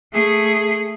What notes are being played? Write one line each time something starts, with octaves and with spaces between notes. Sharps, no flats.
A3 G#4